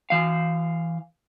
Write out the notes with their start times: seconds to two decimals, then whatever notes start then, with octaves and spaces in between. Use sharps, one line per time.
0.10 E3 F5